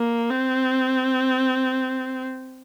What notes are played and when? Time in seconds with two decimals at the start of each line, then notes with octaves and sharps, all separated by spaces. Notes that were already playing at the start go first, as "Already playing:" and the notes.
Already playing: A#3
0.30 C4